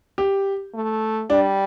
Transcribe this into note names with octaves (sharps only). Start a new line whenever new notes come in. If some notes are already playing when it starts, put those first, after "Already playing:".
G4
A3
G3 D4